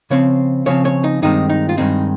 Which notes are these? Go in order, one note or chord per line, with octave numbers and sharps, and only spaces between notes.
C#3 F3 C4 C#5
C#3 F3 C4 C#5
C#5
D#4
G2 D#3 G#3 C4 D#4
D#4
F4
G2 D#3 G#3 C4 D#4